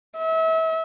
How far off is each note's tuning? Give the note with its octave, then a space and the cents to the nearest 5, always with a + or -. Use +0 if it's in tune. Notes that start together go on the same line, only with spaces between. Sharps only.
E5 -35